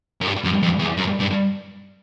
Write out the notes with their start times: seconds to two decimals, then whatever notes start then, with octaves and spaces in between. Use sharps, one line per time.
0.21 F#2
0.27 G2
0.44 F#2
0.63 F2
0.79 E2
0.97 F#2
1.20 G2